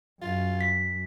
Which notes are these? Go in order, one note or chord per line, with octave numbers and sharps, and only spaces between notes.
F#2 F4
B6